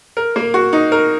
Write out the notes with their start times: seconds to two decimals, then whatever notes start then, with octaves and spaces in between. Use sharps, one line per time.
0.17 A#4
0.36 A#3
0.54 F#4
0.73 D#4
0.92 A#4